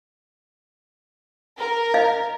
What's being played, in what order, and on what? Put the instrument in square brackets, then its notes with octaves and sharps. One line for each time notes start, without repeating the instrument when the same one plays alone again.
[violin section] A#4
[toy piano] D#5 F5